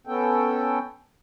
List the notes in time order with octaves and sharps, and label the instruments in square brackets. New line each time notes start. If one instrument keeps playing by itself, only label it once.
[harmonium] B3 C#4 A4 G5